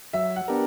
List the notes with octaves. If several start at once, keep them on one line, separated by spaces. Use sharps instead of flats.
F#3 E5
F#5
B3 D4 G4 A#4